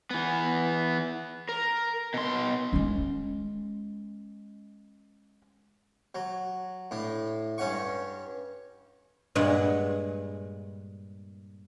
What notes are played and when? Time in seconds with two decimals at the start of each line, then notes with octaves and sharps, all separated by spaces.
0.11 E3 B3
1.49 A#4
2.14 B2 C6
2.73 G#3 C#4
6.15 F#3
6.91 A2 D4
7.58 G2 C#4 F#5 C#6
9.35 G2 A#2 G#3 F#5